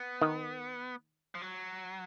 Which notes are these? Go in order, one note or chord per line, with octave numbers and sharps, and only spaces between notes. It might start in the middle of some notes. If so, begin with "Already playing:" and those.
Already playing: B3
D#3
F3
F#3